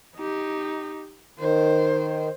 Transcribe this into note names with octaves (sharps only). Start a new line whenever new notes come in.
D#4 G4
D#3 C5